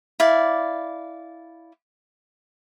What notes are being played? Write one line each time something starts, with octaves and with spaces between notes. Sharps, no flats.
E4 D5 F5